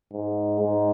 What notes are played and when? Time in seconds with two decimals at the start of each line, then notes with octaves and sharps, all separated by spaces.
0.12 G#2
0.59 G#2